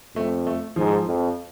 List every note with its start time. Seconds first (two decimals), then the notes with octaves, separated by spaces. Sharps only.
0.15 F2 A3
0.47 A3
0.76 G#2 F3
1.07 F2